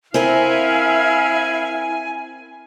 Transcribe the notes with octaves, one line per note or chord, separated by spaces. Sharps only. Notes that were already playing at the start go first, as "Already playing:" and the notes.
C4 E4 A#4 E5 F5 G#5